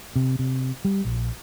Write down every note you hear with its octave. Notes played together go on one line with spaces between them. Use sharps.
C3
C3
G3
A#1